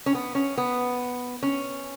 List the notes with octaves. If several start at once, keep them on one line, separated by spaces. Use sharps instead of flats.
C#4
B3
C#4
B3
C#4